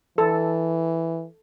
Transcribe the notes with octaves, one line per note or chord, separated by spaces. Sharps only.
E3 A4